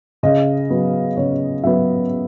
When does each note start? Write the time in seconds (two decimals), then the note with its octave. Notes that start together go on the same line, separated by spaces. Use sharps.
0.23 C#3 D#5
0.70 F#3 B3
1.17 C#3 C#5
1.64 F#3 B3 E5